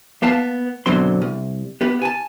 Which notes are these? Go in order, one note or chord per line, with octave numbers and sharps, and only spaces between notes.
A#3 B3 F5 A5
F#2 B2 D3 F#3 C4 C6
C2
B3 G4 B4
G#5 A5